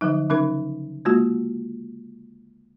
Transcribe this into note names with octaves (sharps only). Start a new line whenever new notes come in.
D3 F3 F#3 D#4
C#3 F#3 C#4 D#4 A#4
G#3 A#3 F4 F#4